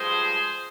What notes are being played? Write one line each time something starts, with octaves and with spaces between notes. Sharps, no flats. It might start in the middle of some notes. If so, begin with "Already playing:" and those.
Already playing: G2 F3 G#3 G#4 C5